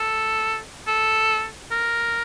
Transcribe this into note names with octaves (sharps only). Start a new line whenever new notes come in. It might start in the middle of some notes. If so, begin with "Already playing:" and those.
Already playing: A4
A4
A#4